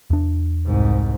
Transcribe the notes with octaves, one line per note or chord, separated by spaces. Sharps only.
E2 D4
C2 G#2